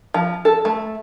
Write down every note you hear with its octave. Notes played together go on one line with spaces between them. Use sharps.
F3
A4
A3